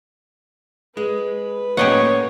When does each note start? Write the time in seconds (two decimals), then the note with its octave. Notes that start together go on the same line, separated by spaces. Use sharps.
0.97 G#3 B4
1.77 A2 A#3 C#4 G4 C#5 D#5 F#5